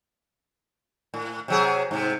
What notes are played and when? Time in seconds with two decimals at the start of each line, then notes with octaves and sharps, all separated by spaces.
1.14 A2
1.48 C3 F#3 G#4
1.91 G#2 C3